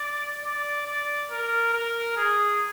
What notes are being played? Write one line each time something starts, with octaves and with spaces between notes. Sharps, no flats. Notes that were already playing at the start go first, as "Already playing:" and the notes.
Already playing: D5
D5
D5
A#4
A#4
G#4